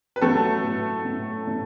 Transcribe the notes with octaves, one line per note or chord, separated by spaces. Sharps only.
B4
F#3 A3 A4
A2
A2
A2